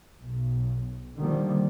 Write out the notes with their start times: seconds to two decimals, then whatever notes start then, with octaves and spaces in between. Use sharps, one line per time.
0.19 B1
1.17 D3 D#3 F3 G3 A#3